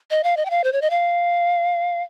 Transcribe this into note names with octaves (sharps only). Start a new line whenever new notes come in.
D#5
F5
D#5
G5
F5
C5
C#5
D#5
F5